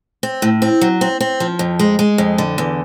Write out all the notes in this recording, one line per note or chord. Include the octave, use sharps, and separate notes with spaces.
C4
A2
C4
F#3
C4
C4
F3
F2
G#3
G#3
F2
D3
E2